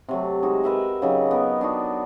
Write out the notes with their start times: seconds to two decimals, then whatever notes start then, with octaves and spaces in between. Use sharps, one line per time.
0.08 C3 F#3 A3
0.42 G#3 D#4 F#4
0.64 A#4 B4 E5 F#5
1.02 C#3 F#3 D#4 G4
1.31 B3 A#4 B4
1.61 D4 D#4 F#4